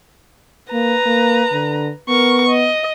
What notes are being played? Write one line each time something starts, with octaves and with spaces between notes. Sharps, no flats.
A#3 B4 A#5
A#3
D3
B3 A#4 C#6
D#5